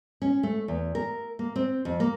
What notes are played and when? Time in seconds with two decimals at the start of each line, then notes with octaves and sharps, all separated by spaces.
0.22 C#4
0.43 A3
0.68 E2
0.95 A#4
1.39 A#3
1.56 C4
1.85 F2
2.00 A#3